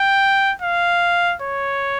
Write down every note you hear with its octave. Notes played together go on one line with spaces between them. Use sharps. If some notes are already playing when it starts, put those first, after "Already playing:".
Already playing: G5
F5
C#5